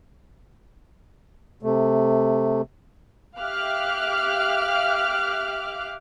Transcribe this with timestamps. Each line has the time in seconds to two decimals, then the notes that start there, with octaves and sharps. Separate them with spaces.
1.63 C3 A3
3.40 G4 E5 F5 D6 F6 F#6